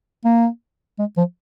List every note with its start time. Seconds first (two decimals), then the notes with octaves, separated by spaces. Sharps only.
0.25 A#3
0.99 G#3
1.17 F3